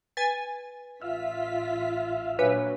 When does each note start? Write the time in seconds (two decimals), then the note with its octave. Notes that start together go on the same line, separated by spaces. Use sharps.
0.17 B4 G#5 A6
1.02 A1 F4 E5 F5 B6
2.39 A#2 F#3 D4 B4 C#5 G#5